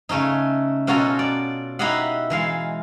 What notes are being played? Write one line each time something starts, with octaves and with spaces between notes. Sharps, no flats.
C#3 A3 C#4 D#4
B2 C#4 F4 F#4 A4 A#5
D5
D#4 E4 G4 D#5 F5 F#5
E3 G#3 F5